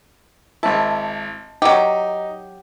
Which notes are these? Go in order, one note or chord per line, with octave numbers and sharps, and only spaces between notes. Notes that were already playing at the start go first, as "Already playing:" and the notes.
G#1 E4 A5
F#3 D#4 G4